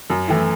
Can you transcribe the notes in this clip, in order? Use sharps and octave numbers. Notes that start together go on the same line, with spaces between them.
F#2
E3 A3 E4